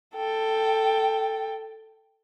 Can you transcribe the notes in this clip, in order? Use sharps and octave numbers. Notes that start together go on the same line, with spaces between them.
A4 G5